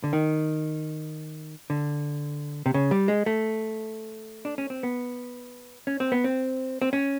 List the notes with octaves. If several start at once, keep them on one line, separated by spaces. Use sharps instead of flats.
D3
D#3
D3
C3
C#3
G3
G#3
A3
D4
C#4
C4
B3
C#4
C4
B3
C4
C4
C#4